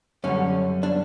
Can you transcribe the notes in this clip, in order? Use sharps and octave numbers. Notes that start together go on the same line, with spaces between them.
F#2 D3 G3 C#4
D4